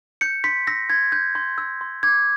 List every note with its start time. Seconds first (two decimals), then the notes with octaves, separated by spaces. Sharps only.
0.21 G6 C#7
0.44 C6 B6
0.67 E6 A#6
0.89 C6 G#6
1.12 G6
1.35 C6
1.58 E6
1.81 C6
2.03 D6 G#6